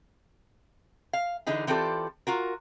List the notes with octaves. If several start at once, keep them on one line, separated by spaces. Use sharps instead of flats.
F5
D3 E3 D#4 G#4
E3 C4 F4 G4 A4 D5
F4 F#4 A#4